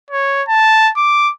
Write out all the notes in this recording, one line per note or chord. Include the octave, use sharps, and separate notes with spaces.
C#5
A5
D6